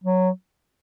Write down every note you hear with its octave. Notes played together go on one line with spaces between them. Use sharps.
F#3